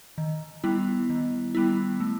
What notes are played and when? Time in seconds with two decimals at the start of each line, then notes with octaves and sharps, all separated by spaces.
0.18 D#3
0.64 G3 B3 E4
1.09 D#3
1.55 G3 B3 E4
2.00 A3